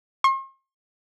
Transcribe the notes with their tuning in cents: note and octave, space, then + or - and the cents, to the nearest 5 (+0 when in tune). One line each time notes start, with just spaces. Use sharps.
C6 +45